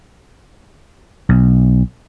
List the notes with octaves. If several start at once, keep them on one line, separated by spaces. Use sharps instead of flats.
B1